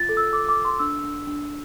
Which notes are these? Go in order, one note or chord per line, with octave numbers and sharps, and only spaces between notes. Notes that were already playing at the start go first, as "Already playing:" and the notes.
Already playing: F4 A6
A4
E6
A4 D6
D6
A4
C6
D4 E6
D4
D4